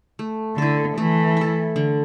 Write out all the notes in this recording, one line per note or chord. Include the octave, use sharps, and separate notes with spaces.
A3
D3 E4 A4
E3 A3
E4 A4
D3